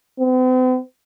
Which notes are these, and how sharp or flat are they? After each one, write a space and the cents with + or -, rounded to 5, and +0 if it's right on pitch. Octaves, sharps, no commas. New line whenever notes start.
C4 -45